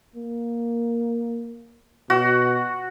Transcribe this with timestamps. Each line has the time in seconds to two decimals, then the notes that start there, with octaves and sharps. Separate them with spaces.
0.15 A#3
2.10 B2 F#4